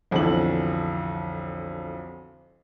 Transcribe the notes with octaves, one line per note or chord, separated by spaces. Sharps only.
B1 F2 D3 E3 A5 F#7